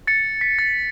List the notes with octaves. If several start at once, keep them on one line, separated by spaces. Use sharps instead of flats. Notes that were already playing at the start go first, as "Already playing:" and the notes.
A6 C#7
B6
A6